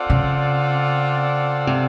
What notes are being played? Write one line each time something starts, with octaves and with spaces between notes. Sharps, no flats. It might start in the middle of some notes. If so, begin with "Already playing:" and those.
Already playing: C4 F4 A4 D5 F#5
C#3
C3